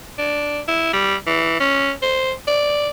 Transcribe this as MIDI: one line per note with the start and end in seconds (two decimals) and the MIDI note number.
0.18 0.61 62
0.68 0.93 64
0.93 1.15 55
1.27 1.58 52
1.60 1.92 61
2.03 2.32 72
2.47 2.90 74